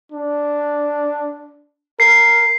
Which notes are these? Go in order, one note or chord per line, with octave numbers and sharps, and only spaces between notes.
D4
A#4 C7